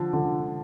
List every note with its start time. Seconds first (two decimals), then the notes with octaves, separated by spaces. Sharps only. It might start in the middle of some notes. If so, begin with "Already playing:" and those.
Already playing: D3 F3
0.13 D3